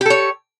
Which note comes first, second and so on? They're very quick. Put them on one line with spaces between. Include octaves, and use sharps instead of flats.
G4 A4 C#5